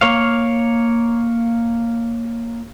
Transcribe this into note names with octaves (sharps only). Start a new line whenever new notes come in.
A#3 C#5 F5